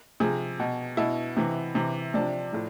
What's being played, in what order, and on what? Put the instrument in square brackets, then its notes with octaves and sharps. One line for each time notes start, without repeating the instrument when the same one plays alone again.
[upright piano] C3 F3 G#4
B2
B2 E4
C3 E3
C3 E3
C3 F3 D4
A2 F3